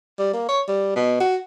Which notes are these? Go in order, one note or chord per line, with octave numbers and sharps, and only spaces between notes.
G3
A#3
C#5
G3
B2
F#4